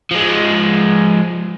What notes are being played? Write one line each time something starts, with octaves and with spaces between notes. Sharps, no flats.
F3 G#3